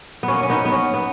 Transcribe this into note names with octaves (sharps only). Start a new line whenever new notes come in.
B3
B2 A#3 C#4
C#4
B3 D#4
B3
C#4
B3